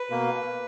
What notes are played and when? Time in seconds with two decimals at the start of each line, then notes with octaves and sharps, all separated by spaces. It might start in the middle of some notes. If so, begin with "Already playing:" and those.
Already playing: B4
0.10 B2 A#3